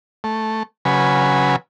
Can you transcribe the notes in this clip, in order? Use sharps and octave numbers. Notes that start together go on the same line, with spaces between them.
A3
C#3 F#3 B4 G#5